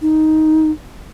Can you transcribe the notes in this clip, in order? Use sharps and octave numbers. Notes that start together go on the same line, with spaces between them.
D#4